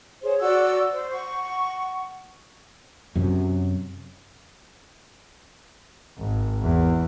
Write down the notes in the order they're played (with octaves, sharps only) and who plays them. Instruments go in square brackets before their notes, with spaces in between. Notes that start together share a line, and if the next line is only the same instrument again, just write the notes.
[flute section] G#4 C5 C#5
F#4 D5 F#5 E6
C5
F#5 C#6
[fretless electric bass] F#2 C3 F#3
[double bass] G#1
E2